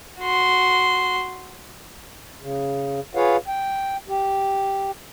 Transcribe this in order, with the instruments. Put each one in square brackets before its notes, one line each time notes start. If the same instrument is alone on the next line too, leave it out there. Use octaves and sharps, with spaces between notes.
[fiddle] F#4 C6
[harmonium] C#3
F4 G#4 B4 C#5 F5 F#5
G5
G4